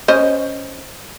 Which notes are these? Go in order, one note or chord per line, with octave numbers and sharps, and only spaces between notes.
C#4 C5 D#5